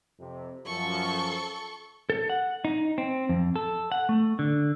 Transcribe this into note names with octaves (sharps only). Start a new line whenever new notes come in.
F2 C3
F#2 F3 A4 C#6
A4
F#5
D#4
C4
F2
A4
F#5
A3
D3